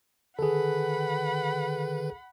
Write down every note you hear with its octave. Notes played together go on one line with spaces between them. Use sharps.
D3 D#3 G#4 A4 B4 F#5 B5